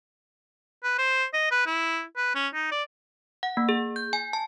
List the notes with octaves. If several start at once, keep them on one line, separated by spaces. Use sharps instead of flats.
B4
C5
D#5
B4
E4
B4
C#4
D#4
D5
F#5
A#3
G#4
G6
G#5
A5